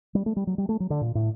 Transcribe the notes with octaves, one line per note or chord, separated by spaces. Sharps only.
G3
A3
G3
F#3
G3
A3
F#3
D3
A#2
A2